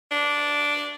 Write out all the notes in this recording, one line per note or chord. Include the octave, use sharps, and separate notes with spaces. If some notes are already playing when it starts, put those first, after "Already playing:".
D4